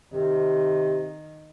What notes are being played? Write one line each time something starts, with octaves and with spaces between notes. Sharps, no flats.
C3 D#3